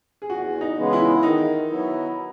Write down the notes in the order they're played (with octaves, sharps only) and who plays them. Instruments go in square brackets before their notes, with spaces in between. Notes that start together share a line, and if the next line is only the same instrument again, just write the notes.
[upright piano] G#4
[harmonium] E2 [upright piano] F#4
[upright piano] D#4
[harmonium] C#3 E3 G#3 B3
[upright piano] E4
[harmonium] D#3 [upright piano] D#4
[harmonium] F#3 B3 E4